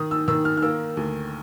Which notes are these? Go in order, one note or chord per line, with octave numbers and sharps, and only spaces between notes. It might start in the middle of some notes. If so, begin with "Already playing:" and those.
Already playing: D#3 D#6
E6
D#3 E6
F6
F6
A#3 E6
D2